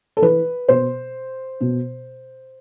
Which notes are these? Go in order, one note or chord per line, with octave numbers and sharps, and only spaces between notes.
A4
E3 B4
B2 C5
B2